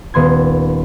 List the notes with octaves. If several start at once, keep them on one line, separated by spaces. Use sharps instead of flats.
D#1 B3 C6 G#6